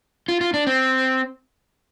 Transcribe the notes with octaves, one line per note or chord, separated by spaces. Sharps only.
F4
F4
D4
C4